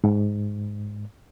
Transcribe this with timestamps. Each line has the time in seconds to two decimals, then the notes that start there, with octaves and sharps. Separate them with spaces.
0.04 G#2